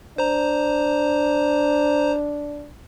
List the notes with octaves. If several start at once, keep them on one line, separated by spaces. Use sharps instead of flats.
D4 C5 A#5